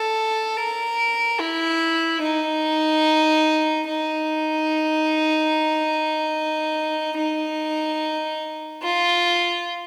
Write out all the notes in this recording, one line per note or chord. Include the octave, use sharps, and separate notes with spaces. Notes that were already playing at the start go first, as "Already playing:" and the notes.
Already playing: A4
A#4
E4
D#4
D#4
D#4
F4